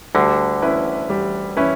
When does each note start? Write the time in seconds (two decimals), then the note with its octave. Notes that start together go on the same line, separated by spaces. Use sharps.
0.15 D2 D3 G3
0.62 C#4 E4 B4
1.10 G3
1.57 C#4 E4 B4